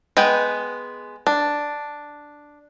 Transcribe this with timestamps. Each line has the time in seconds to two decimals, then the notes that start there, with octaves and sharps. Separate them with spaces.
0.17 G#3 B3 B4 G5
1.27 D4